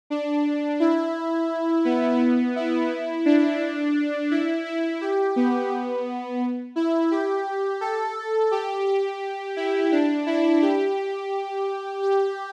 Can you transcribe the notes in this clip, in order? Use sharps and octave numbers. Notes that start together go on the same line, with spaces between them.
D4
E4
B3
E4
D4
E4
E4
G4
B3
E4
G4
A4
G4
G4
E4
D4
E4
G4
G4